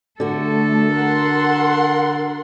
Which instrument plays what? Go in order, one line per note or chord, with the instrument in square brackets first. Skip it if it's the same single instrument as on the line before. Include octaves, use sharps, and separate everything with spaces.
[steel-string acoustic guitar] D3 F#4 [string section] A3 [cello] A4
[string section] A#4 F#5 C6